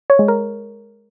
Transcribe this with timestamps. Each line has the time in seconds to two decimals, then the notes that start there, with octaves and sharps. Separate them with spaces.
0.10 C#5
0.19 G#3
0.28 A#4